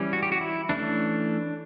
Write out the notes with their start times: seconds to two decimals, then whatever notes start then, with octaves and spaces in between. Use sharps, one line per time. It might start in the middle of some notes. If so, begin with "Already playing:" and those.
Already playing: E3 G3 C#4
0.13 F#4
0.23 G4
0.32 F#4
0.41 E4
0.69 E3 A3 C#4 D4